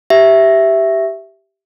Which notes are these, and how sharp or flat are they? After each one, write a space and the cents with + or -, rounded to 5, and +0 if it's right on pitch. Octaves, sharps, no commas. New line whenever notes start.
G4 -10 E5 +0